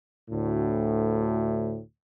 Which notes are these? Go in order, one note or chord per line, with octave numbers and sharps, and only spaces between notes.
D2 A2